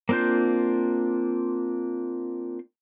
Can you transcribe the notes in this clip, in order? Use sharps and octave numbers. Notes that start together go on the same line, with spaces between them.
A#3 C4 D4 F4 G6